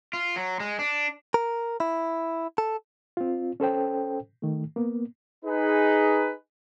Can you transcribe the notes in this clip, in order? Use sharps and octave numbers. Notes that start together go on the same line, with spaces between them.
F4
F#3
G#3
D4
A#4
E4
A4
C4 F4
C#4 A4 C5 G5
D#3 A3
A#3 B3
D#4 G#4 B4